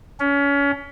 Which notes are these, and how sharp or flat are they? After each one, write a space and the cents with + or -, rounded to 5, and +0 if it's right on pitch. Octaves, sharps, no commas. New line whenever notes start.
C#4 +30